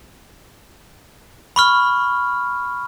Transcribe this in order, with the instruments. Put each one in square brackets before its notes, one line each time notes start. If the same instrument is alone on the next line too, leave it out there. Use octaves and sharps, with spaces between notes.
[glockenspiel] B5 C#6 F6